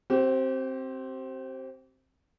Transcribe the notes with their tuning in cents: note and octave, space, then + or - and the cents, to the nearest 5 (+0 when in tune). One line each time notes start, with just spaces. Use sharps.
C4 +10 G4 -35